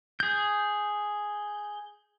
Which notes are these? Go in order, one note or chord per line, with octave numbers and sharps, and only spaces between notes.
G#4 G6